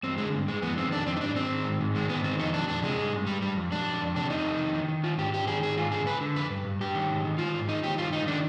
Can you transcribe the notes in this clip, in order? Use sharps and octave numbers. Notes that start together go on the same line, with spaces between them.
G2 C4
D3 G#3
G2
G2 G#3
F2 B3
D#3 C4
F2 D4
F2 C4
D#4
G#2 D4
G#2 C4
D#3
G#2
G#2
D#3 G#3
G#2 B3
D#3 C4
F2 D#4
F2 D4
F2 D4
C3 G#3
G2
G2
G2 G3
G2 G3
F2
F2 D4
F2
F2
C3 D4
F2 D#4
F2
D#3
D#3
D#3
D#3 F4
G#2 G4
G#2 G4
D#3 G#4
G#2 G#4
G#2 F4
D3 G#4
D3 B4
D3
F2 B4
G2
G2
G2 G4
D#3
G#2
D#3
D#3 F4
G#2
D#3 D#4
D#3 G4
G2 F4
G2 D#4
D#3 D4